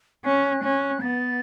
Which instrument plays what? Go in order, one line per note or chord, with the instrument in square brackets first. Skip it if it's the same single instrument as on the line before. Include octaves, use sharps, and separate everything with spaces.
[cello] C#4 [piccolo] F#6
[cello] C#4
[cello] B3 [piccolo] A6